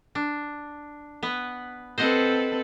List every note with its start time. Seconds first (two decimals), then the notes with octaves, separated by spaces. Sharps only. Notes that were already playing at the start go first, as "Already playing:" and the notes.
0.15 D4
1.23 B3 B4
1.98 C4 A4 B4 C5 D#5 F#5